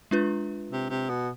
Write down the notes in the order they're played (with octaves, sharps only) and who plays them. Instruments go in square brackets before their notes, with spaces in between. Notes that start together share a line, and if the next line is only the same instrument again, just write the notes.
[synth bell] G#3 D4 F4 B4
[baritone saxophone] C3
C3
B2